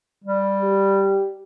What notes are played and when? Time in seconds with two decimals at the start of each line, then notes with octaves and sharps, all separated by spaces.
0.24 G3
0.62 G4